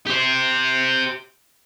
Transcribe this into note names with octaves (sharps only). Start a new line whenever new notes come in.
G4 C5